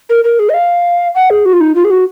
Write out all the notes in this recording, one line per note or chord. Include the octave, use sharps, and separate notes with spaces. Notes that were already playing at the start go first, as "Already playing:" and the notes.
A#4
A#4
G#4
D#5
F5
F#5
G#4
F#4
F4
D#4
F4
G#4
F#4